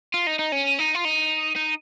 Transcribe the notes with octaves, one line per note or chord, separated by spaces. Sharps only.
F4
D#4
D#4
C#4
D#4
F4
D#4
D#4